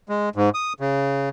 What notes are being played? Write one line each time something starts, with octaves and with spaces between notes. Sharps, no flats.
G#3
G#2
D#6
C#3